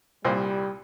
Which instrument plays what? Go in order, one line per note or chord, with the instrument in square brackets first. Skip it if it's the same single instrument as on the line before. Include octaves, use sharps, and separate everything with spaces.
[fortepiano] C2 A#2 C5 [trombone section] G3